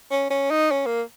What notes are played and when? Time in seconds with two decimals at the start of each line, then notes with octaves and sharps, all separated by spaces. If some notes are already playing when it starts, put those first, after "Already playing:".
0.11 C#4
0.31 C#4
0.51 D#4
0.71 C#4
0.86 A#3